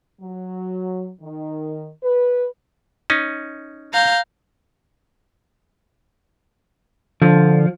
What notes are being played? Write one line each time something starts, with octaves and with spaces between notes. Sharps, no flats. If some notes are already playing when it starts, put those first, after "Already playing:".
F#3
D#3
B4
C#4 D#4
F5 A#5 G6
D3 F3